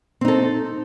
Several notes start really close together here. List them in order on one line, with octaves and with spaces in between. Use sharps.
C4 D#4 A4